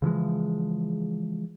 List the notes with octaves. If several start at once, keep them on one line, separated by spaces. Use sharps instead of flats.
C#3 E3 F3 G#3